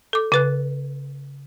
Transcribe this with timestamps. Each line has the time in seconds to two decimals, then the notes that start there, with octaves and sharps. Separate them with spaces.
0.13 A4 D6
0.32 C#3 B4 F#6